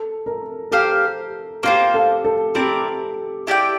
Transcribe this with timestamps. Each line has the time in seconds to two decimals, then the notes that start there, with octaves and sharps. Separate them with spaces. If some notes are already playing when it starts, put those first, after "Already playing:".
Already playing: A4
0.26 A#4
0.71 G4 A4 C5 F5
1.63 A#3 F4 G4 C5
1.94 A4
2.25 A4
2.55 C4 E4 G4 A#4 D5
3.47 E4 G4 D5 G5